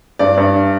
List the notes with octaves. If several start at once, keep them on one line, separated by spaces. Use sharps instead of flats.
G2 D5
G2